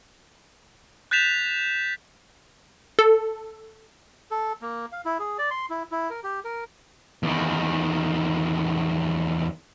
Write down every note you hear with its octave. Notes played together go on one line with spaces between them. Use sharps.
F#6 G6 A6 B6 E7 F7
A4
A4
A#3
F5
E4
G#4
D5
C6
E4
E4
A#4
G4
A#4
E2 D#3